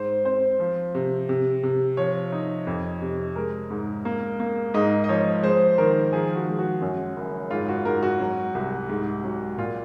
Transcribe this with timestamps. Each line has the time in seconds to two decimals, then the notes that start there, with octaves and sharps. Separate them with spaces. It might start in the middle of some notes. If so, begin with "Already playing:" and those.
Already playing: G#2 C5
0.25 C4 C5
0.60 F3
0.95 C3
1.29 C3
1.63 C3
1.97 F3 C#5
2.32 D#4
2.67 F2
3.01 C3
3.36 G#3 A#4
3.70 G#2
4.05 A#3
4.40 A#3
4.74 G#2 D#5
5.04 D#5
5.09 F3 C#5
5.43 G#3 C5
5.78 D#3 A#4
6.13 F3 G#4
6.36 F#4
6.47 G#3
6.59 F#4
6.82 F#2
7.16 F#1
7.51 G#2 F4
7.68 F#4
7.85 G#2 A#4
8.03 F#4
8.20 F#3
8.55 C2
8.89 G#2
9.24 F#3
9.58 A#2 F4